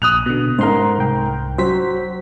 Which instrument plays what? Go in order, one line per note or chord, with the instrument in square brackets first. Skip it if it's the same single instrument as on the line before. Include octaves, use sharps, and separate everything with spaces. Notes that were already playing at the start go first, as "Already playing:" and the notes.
[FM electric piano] A#1 [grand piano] D#6 F#6 F7
[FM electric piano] B2 D3
[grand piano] G#2 A#4 [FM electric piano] C5 C6
[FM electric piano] C2 G5
[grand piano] F#3 [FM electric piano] C5 B6